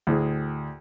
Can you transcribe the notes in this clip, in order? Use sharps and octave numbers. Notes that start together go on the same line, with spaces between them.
D2 A2 G#4